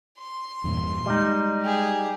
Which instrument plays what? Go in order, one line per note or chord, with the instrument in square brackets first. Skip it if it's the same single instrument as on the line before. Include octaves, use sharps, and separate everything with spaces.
[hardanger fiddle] C6
[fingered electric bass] E2 G2 A#2
[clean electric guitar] G3 D#4 [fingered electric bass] G#3
[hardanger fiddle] G4 G#4